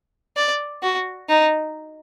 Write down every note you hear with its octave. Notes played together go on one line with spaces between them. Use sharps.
D5
F#4
D#4